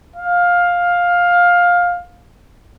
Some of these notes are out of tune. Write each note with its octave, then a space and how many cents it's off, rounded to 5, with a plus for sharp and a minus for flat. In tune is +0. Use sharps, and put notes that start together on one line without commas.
F5 +15